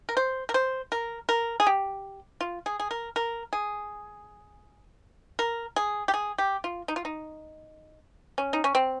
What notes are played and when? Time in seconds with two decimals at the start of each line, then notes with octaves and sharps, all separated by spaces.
0.09 A#4
0.17 C5
0.49 A#4
0.54 C5
0.92 A#4
1.29 A#4
1.60 G#4
1.67 G4
2.41 F4
2.66 G#4
2.80 G#4
2.91 A#4
3.16 A#4
3.53 G#4
5.39 A#4
5.76 G#4
6.08 G4
6.14 G#4
6.38 G4
6.64 F4
6.88 D#4
6.96 F4
7.05 D#4
8.38 C#4
8.53 D#4
8.64 C#4
8.75 C4